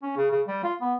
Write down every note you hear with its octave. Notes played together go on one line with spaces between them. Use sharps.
C#4
C#3
C#3
G3
F4
B3